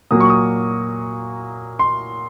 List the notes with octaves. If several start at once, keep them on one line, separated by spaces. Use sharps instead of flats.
A#2 F#3 A#3 D#6
C#6
D#6
C6